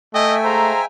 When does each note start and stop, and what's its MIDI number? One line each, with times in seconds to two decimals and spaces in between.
0.14 0.72 57
0.14 0.36 75
0.14 0.85 76
0.14 0.85 79
0.14 0.85 80
0.45 0.81 56
0.45 0.82 72
0.45 0.81 77
0.45 0.81 82